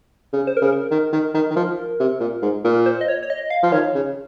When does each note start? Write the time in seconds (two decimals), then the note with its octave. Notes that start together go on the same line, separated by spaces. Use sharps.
0.33 C#3
0.47 C5
0.57 A#4
0.62 C#3
0.72 A#4
0.91 D#3
1.13 D#3
1.34 D#3
1.51 D#3
1.56 F3
2.00 C3
2.20 A#2
2.42 G#2
2.65 A#2 A#4
2.86 C5
3.01 D#5
3.08 C#5
3.23 C#5
3.30 D#5
3.50 F5
3.63 F3
3.72 D#3 C#5
3.94 C#3